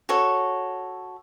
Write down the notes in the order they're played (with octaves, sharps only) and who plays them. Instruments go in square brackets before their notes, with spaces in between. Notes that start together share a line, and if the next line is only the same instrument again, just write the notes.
[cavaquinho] F#4 A4 C#5